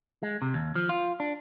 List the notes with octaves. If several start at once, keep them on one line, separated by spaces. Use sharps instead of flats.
G#3
C3
D#2
F3
F4
D4